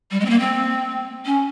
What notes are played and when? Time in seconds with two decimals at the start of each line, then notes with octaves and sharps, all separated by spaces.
0.11 G3
0.20 G#3
0.25 C4
0.30 A#3
0.40 C4
1.25 C#4